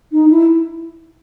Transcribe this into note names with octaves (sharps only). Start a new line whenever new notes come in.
D#4
E4